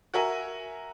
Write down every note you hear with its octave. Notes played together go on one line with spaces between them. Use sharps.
F#4 A#4 E5 G#5